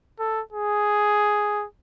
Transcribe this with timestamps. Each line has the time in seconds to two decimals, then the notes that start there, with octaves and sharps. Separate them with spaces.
0.19 A4
0.53 G#4